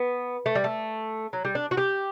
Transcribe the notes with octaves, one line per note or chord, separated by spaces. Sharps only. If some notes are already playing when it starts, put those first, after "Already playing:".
Already playing: B3
A3
G3
A3
F#3
G3
D4
F#4
G4